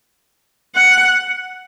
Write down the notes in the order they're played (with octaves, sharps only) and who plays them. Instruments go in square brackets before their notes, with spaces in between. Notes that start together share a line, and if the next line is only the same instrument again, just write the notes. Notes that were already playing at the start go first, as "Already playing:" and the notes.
[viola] F#5